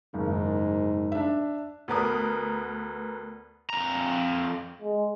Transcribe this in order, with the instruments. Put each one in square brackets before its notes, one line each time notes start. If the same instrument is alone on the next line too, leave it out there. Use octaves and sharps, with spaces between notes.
[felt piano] F#1 D#3 [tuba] G#2
[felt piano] D4 E5
[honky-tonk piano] D2 B3 A#4 D#6
[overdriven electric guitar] F2 A#5
[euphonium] G#3